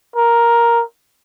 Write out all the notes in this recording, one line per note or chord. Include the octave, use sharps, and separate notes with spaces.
A#4